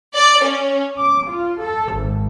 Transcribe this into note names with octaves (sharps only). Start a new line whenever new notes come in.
D5
C#4
D6
F4
A4
G#1